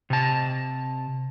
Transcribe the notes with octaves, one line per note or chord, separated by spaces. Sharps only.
C3 A5